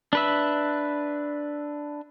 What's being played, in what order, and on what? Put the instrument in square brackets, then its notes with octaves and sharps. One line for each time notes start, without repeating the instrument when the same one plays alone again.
[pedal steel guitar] D4 B4 E5